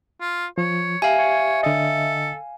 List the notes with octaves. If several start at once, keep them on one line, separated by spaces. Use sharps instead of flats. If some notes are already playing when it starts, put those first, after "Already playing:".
F4
F3 C#5
G4 E5 F5 G#5
C#5
D3 A4 D#5